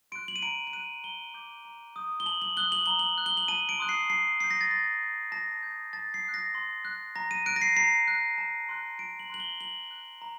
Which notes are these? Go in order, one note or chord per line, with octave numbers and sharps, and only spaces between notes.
C6 F#6 D7
F#7
D#7
A#5 D7
D7
F#6 D#7
A#5 G7
D6 G6
A#5
D#6 G6
G7
A5 F#7
F#7
D#6 F#6 G7
F#7
A#5 G7
F#7
F#6
G7
F#7
A5 D#7
D7
C6 D#6 F#6
C7
A5 C7
D#6 G6 C7
A#6
A6
C6 A#6
G6
A5 A#6
D#6 G6
A5 A6
C7
D#6 F#6
A#6
C6
F#6
A#5 A#6
D#7
F#6 D7
A#6
C7
A#5 C7
F#6
A5
C6 F#6
A5 D7
F#7
C6 F#6 F#7
G7
A#5 F#7
F#6
A#5